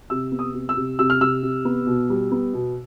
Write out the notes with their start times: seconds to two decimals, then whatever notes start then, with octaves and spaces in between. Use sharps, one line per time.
0.10 C3 E6
0.32 B3
0.39 D#6
0.54 C3
0.69 E6
0.77 C3
0.99 C3 E6
1.10 F6
1.20 C3 E6
1.43 C3
1.65 B3
1.86 B2
2.10 G3
2.32 B3
2.54 B2